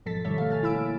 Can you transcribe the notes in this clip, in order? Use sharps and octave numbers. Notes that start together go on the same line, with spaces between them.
G#2 B2 F3 A4 A6 B6
D#3 G3 A4 C#5 E5
A3 F5
G#5 F6 A6
E4 B5 E6 D7
A#3